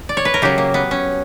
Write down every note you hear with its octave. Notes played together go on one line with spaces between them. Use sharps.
D5
C#5
B4
A#4
C#3 F#3 G4
A#3
B3
C#4